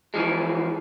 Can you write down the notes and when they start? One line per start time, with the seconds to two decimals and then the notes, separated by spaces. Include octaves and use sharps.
0.14 E3 F3 G#3